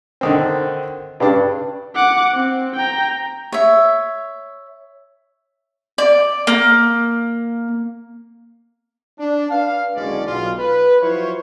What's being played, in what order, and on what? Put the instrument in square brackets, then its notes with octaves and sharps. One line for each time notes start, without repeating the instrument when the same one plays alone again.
[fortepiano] D3 D#3 C4
[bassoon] G2 [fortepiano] C#3 D4
[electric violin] F#5 D6
C4
G5 A#5
[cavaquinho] C#5 E5
[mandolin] D5
A#3
[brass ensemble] D4
D4 B4 D5 F5
F#1 D3 G#3 C#4 D5
B1 F4
B4
F3 F#3 E4 F4 C5 C#5